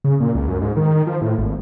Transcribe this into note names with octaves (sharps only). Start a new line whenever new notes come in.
C#3
A#2
C#2
F#2
G#2
D#3
F3
A2
G#1